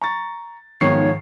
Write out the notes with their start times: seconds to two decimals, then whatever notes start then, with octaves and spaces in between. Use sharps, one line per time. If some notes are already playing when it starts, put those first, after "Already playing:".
0.01 A#5 C#6 A6
0.81 B1 G#2 D#3 F3 C#5 C#6 C7